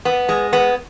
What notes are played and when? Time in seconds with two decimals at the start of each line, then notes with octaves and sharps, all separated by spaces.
0.05 B3
0.29 G#3
0.53 B3